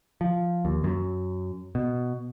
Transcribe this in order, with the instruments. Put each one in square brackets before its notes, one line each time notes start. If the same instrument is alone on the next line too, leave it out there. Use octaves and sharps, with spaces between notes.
[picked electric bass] F3
D#2
F#2
B2